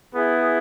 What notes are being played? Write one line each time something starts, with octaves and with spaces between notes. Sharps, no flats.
B3 E4 G#4